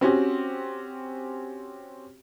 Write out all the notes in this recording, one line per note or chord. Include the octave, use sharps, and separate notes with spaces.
C4 C#4 F#4 G4